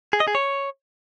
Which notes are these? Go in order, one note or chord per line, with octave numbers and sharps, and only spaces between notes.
G#4
D#5
G#4
C#5